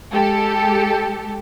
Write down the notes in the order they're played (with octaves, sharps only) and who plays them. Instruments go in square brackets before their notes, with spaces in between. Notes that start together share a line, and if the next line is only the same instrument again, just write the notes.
[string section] G#3 G4 A4